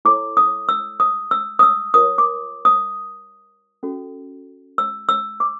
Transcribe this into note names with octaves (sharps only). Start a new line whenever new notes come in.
E4 A4 C#5 D6
D#6
E6
D#6
E6
D#6
E6
F4 A#4 C#5 D#6
D6
D#6
C#4 F#4 A4
E6
E6
D6